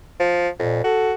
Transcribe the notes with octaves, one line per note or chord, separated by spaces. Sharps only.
F3
F2 A#2
F#4 A4